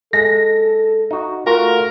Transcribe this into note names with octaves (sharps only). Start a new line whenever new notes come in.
G#3 A4 A#6
D#4 F#4
A3 F4 F#4 A#4